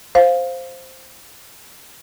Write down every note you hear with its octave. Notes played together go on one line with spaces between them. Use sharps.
C5 F5